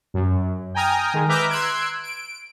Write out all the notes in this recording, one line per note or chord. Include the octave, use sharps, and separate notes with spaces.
F#2
G5 G#5 A#5 D#6 F6
D#3 G#3
B4 E5 A#5 D6 F6 G6
C6 E6 F#6 G#6 D7
D7